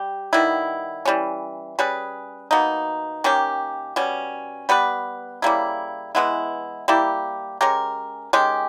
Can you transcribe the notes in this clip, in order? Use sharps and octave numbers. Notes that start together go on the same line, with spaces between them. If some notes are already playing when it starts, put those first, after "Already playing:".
Already playing: G3 G4
D#3 G3 B3 E4
E3 G3 C#4
G3 C#4 G#4 B4
B2 A#3 D#4
D#3 A#3 C#4 G4
B2 G3 C#4
G3 B3 G4 B4
C#3 G3 A#3 E4
E3 G#3 B3 E4
G3 A#3 E4 G4
G#3 C#4 G4 A#4
D#3 G#3 C#4 G4